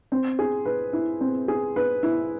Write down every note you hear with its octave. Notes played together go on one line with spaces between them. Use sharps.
C4
G#4
B4
E4
C4
G#4
B4
E4